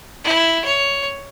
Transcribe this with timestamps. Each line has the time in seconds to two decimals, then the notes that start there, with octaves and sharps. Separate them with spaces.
0.24 E4
0.65 C#5